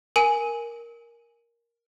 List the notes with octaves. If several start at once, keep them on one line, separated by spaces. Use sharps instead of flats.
A#4 G#5 D#7